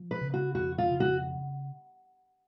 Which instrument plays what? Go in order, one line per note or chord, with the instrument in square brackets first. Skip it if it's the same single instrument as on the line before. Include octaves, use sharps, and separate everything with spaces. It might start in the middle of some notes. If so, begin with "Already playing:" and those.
Already playing: [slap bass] F3
[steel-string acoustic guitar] B4
[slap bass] C#3
[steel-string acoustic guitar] F#4
[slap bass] F2 [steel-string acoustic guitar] F#4
[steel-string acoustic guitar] F4
[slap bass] C#3
[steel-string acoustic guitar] F#4